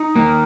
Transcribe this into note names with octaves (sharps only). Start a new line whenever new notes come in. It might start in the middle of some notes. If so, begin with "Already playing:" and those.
Already playing: D#4
A#3